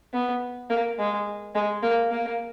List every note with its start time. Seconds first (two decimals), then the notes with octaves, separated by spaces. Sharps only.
0.13 B3
0.70 A#3
0.98 G#3
1.55 G#3
1.83 A#3
2.11 A#3